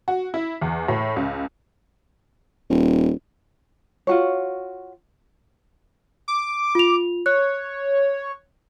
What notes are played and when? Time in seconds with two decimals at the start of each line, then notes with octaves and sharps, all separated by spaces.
0.08 F#4
0.34 E4
0.61 E2
0.88 A2
1.16 C#2
2.69 D#1
4.07 F4 F#4 C#5
6.28 D6
6.75 F4 F7
7.26 C#5 F#6